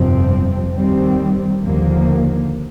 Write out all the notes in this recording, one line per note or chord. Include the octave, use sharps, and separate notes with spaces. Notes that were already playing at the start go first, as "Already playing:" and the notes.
Already playing: G1 F2 C3 F3 C4
D#2 D#3 G3 C4
D#2 D3 F3 A#3